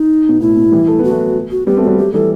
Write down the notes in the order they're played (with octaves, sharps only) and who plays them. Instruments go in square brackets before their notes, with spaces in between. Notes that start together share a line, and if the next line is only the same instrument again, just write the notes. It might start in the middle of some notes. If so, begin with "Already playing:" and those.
Already playing: [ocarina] D#4
[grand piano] B2
[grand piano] A2 [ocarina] E4
[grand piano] B2
E3 G3
A3
[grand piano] B3 [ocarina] F#4
[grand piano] F#3 A3
[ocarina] F#4
[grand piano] G3 B3 [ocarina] G4
[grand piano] A3 C4
[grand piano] G3 B3 [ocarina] F#4
[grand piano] F#3 A3 [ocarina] G4
[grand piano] E3 G3 [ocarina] A4